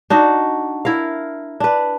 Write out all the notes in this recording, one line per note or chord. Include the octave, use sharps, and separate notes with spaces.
D4 D#4 F#4
E4 A#4 F5
D4 B4